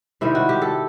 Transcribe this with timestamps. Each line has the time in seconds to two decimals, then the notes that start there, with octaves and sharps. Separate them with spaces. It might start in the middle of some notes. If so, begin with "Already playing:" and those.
0.21 C3 D#3 G3 E4
0.35 F#4
0.49 G4
0.62 A4